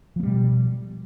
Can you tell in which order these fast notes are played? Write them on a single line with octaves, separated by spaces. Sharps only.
F3 A#3 G3 B2